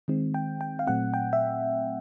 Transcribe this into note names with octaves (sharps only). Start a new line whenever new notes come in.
D#3 G#3 C4
G5
G5
F5
A#2 F#3 A3 C4 F#5
G5
E5